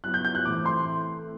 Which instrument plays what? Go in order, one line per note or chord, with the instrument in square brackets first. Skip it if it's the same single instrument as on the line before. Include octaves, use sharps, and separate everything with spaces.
[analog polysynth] F#3 B3 E4 [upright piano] F#6
[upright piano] G6
G6
F#6
[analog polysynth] A2 E3 A3 C4 E4 [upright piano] D6
[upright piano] C6